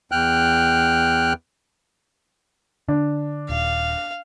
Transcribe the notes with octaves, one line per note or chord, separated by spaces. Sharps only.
E2 G5 F6 F#6
D3 D4
D#1 F5